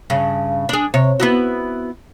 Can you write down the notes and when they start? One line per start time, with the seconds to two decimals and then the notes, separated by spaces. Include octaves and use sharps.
0.10 G2 C#3
0.69 D4 G#4
0.94 C3 C#5
1.20 B3 E4 F#4